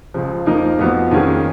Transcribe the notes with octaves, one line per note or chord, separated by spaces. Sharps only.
C#2 C#3 F3
F2 F3 A#3 D#4 A#4
F2 F3 B3 F#4
F2 D#3 A#3 C#4 G#4